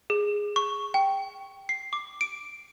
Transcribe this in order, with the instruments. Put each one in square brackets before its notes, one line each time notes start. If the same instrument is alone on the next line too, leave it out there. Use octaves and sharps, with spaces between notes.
[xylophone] G#4
C#6
G5
C7
D6
D7